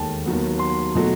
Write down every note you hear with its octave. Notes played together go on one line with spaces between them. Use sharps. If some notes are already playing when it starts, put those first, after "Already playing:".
Already playing: E1 D#2 D#3 A3 G5 A5
D#2 D#3 F#3 B3
C6
B2 F#3 A3